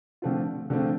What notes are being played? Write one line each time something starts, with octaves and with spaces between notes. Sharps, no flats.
D3 F3 A3 C4 F4
D3 F3 A3 C4 F4